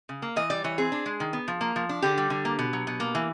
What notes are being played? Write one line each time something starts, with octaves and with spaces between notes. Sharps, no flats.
C#3
A#3
E3 D#5
G3 D5
E3 C#5
C4 G#4
D4
G#3
D#3
B3
F3
A#3
F3
D4
D3 G4
G3
D3
A#3
B2
F#3
B2
A#3
E3